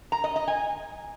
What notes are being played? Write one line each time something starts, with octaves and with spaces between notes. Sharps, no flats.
A#5
D#5
D#5
G#5